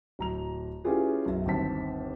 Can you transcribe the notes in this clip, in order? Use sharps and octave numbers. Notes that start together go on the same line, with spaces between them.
D1 A#5 F7
C#4 E4 F4 G4 G#4 B4
B1 F#2 E5
G1 D#2 D#3 C4 A5 B6